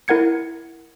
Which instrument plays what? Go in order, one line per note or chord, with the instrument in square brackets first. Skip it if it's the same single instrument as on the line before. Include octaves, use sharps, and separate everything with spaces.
[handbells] E4 A#4 F#5 G#6 C#7